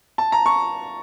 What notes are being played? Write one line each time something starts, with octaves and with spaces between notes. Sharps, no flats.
A5
A#5
C#6